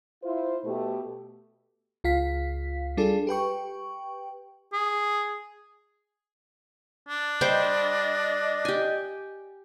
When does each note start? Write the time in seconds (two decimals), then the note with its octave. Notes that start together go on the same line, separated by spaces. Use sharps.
0.24 E4 F4 C5
0.64 B2 A3 G4
2.04 C#2 F4 F5 B6
2.97 G3 D4 F4 G#4 A4
3.27 G4 B4 G5 C#6
4.73 G#4
7.09 D4
7.41 G3 G4 C5 D5 D#5
8.65 G4 G#5